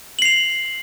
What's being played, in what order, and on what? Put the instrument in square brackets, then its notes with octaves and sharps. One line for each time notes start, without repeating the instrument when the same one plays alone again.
[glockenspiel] F#7
C7
F7